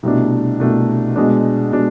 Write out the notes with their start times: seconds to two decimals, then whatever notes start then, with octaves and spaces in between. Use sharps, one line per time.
0.03 C2 B2 A3 D4
0.60 C2 B2 A3 D4
1.16 B2 G#3 D4
1.72 B2 G#3 D4